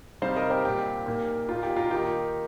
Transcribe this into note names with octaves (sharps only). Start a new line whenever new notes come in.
C3 G3 D#4 C5 F5
A#4 D#5
G4 C5
A#2 G3 C4 G4
A#2 A#3 D#4
A#2 A#3 D#4 F4
G4
F4 A#4
D#3 A#3 D#4 G4